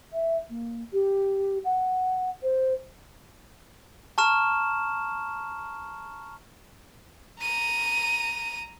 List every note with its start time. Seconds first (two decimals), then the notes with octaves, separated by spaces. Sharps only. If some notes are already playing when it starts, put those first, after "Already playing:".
0.13 E5
0.50 A#3
0.93 G4
1.65 F#5
2.43 C5
4.18 A5 A#5 C#6 F6 E7
7.41 A#5 D#7